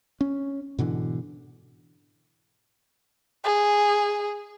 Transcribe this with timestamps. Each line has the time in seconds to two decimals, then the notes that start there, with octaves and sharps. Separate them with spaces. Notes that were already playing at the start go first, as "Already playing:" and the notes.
0.21 C#4
0.79 G#2 B2 D3 E3
3.44 G#4